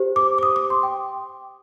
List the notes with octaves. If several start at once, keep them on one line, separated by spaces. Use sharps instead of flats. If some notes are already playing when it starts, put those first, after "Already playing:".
Already playing: G4 C5
D6
D6
D#6
D6
C6
G5